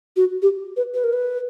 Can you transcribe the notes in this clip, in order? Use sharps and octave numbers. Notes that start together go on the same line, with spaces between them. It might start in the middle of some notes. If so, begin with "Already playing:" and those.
F#4
G4
B4
B4
A#4
B4